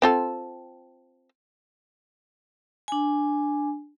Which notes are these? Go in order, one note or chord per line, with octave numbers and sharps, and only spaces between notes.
C4 F4 A4
D4 G#5